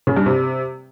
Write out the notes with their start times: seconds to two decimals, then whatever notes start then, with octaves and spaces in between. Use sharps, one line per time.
0.07 C#3
0.17 G2
0.26 C3